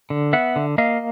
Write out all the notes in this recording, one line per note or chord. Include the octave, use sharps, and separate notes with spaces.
D3
B3 E5 F#5
D3
A#3 D#5 F5